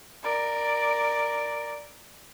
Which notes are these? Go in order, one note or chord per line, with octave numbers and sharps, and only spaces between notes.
A#4 D5